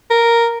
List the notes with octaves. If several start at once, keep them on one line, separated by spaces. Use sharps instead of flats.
A#4